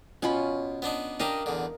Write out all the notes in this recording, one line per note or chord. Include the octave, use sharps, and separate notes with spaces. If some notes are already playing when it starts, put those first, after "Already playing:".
B2 C#4 F4 B5
B3 D4 D#4
D4 G4 A#4 D#5 F5
E2 D3